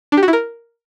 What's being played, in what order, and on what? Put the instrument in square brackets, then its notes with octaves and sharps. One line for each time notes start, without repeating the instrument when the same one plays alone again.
[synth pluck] D4
G4
F#4
E4
A#4